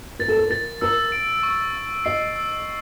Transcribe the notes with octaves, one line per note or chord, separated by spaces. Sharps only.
A#4 A6
A4
A#4
A#4 A6
A#4 E6
D7
C#6
A6
D#5 C7
E6